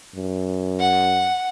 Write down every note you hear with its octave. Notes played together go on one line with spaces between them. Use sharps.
F#2
F#5